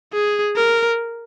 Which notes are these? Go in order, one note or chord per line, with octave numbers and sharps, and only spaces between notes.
G#4
A#4